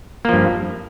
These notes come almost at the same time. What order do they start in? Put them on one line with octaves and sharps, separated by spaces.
A#3 F3 G2